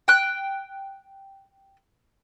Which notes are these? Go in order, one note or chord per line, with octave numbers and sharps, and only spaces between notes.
G5 F#6